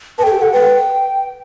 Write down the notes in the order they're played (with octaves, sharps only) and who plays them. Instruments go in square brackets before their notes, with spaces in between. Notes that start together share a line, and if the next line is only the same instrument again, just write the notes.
[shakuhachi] B4 [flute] A5
[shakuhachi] A4 [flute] G5
[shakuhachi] G4
[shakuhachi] A4 [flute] F#5
[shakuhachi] B4 [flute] G5